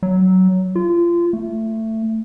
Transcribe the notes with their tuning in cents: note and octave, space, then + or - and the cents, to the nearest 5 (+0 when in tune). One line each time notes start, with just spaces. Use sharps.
F#3 +15
F4 -25
A3 +15